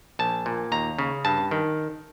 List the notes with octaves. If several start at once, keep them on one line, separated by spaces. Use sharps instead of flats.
A#1 A5
A#2
D#2 A#5
C#3
G2 A5
D#3